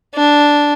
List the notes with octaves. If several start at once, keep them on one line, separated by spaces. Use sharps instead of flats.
D4